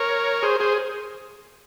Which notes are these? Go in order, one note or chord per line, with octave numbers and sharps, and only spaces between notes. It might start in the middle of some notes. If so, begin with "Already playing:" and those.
Already playing: A#4 C#5
G#4 C5
G#4 C5